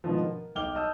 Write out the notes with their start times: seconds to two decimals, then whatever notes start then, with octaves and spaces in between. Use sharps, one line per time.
0.04 G#2 B2 D3 D#3 F3
0.23 A#4
0.55 B1 D#5 G5 D6 F6 G7
0.75 D#5 A5 D#6 E6 G6